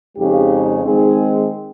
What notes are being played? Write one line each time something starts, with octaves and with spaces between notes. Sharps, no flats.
F2 C#3 G#3 D#4 G4
D#3 G#3 C4 D#4 G#4